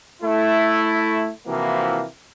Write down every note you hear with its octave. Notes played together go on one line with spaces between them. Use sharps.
A3 E4
C3 E3 F3 A#3 E4 F#4